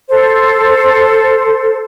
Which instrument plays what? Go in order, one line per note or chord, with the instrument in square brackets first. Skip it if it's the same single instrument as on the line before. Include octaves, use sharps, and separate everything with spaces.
[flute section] A4 C5